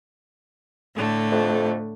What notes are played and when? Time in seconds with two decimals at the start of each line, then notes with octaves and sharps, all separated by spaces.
0.95 A2 D3 A3
1.32 F2